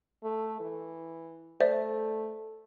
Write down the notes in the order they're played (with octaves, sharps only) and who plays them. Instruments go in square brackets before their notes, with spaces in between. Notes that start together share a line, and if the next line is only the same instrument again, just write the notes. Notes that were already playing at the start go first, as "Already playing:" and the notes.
[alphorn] A3
E3
[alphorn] A3 [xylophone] C5 D5 E5